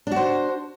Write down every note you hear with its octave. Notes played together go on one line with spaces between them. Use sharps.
D4 F#4 C5